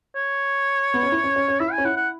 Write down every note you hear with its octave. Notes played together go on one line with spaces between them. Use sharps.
C#5
B3
C#4
E4
C#4
C#4
C#4
E4 E5
G#5
C#4
E4 F#5
F#5